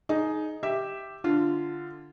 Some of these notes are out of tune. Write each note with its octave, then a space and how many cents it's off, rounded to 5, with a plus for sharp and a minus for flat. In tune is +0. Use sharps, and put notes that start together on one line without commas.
D#4 +0 G#4 +25
G4 +0 E5 +0
D3 +0 F4 -10